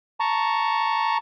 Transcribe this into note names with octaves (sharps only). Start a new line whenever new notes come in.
A5 A#5 C#6